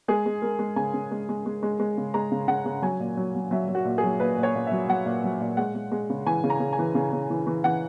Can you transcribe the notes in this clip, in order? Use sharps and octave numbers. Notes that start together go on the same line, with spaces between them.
G#3 G#4
G#3
G#3 A#4
G#3
C#3 G#5
C#3
G#3
G#3
G#3
G#3
G#3
C#3
G#3 A#5
C#3
C#3 F#5
C#3
F#3 G#5
A#2
F#3
F#3
F#3 E5
F#3
F#4
A#2
G#4
F#3
A#2 B4
A#2
C#5
A#2
E5
F#3
F#3 F#5
A#2
F#3
A#2
G#3 F#5
G#3
G#3
C#3
E3 G#5
C#3
A#5
C#3
G#5
E3
C#3
C#3
E3
E3
E3 F#5